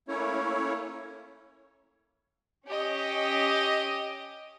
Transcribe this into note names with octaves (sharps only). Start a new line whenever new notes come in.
A3 A#3 C#4 E4 C#5
C#4 G4 D#5